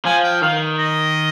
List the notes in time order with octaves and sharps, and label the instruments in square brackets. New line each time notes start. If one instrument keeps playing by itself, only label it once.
[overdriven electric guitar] F3 [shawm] G#5
[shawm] G5
[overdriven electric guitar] D#3 [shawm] F5
[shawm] D#5